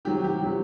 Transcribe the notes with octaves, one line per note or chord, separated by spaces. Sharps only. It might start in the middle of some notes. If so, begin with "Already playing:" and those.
C3 D#3 F#3 G4
G4
C3 D#3 F#3